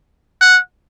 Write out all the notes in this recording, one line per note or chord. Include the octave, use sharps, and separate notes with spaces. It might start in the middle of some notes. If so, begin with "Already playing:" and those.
F#5